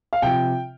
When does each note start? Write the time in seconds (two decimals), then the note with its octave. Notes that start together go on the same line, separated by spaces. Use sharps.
0.13 F5
0.22 C3 F3 G5